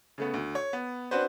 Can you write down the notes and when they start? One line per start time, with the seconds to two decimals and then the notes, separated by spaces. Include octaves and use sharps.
0.18 C#3 A3 B3
0.34 D2
0.55 C#5
0.73 B3
1.11 C4 D4 F#4 B4 C5